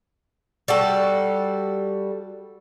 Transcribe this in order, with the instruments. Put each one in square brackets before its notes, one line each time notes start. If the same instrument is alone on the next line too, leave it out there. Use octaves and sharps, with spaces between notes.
[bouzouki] G3 F#4 A4